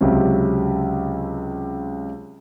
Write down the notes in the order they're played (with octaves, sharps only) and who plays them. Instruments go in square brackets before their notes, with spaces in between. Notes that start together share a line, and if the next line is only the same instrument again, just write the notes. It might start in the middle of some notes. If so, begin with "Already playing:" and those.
[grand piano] C#2 C3 F#3 C4 C#4